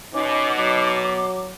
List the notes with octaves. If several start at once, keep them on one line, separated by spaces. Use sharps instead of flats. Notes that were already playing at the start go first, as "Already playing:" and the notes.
B2 C#4 D#4 D6
F#3